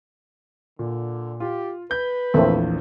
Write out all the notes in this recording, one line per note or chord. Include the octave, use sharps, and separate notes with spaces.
A#2 D3
F4 G4
B4 G6
A#1 E2 A3 A#3 C4